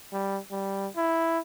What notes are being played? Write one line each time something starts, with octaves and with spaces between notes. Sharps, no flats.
G3
G3
E4